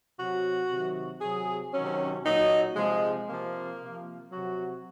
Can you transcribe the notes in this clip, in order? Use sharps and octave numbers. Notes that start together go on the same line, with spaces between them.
C3 F#3 F#4
C3 D#3 F#3
C3 F#3 G#4
C3 D#3 F#3 C#4
A#2 F#3 D#4
C3 F3 G#3
C3 F3 A#3
C3 F3
C3 F#3 F#4